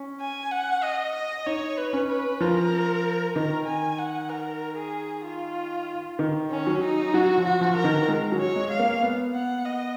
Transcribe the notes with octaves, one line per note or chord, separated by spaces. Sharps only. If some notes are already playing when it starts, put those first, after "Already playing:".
Already playing: C#4
G#5
F#5
D#5
D#5
D#4 C#5
B4
C#4
B4
F3 A#4
D#3 A#4
G#5
F#5
A#4
G#4
F4
D#3
C#4
F#3
D#4
F#3 F#4
F3
F#4
F3
A#4
D#3
G#3
F#3
C#5
G#3
F5
A#3
B3
F#5
D#5